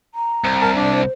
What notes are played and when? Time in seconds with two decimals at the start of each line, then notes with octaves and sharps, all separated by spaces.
0.15 A#5
0.45 C2
0.62 A#4 A5
0.76 D4
0.88 C5